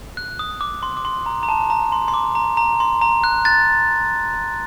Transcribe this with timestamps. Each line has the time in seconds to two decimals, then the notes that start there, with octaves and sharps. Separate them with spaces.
0.17 F#6
0.39 D#6
0.61 D6
0.83 C6
0.97 D6
1.05 C6
1.26 A#5
1.43 A#5
1.49 A5
1.70 A#5
1.92 C6
2.08 C6
2.14 D6
2.35 A#5
2.57 A#5
2.80 C6
3.02 A#5
3.24 F#6
3.45 F#6 A6